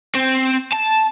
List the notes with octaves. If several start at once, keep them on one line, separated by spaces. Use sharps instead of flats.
C4
A5